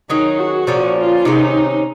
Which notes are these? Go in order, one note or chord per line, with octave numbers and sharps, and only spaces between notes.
D#3 F#3 C#4 D#4 G#4
F#4
A#2 F3 A#3 C#4
F4
C3 D#3 G#3 C#4 D#4